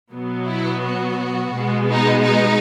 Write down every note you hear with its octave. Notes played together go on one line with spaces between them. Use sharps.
B2 F#3 B3
E4
F#4
B2 G#3 B3
D#4
D#4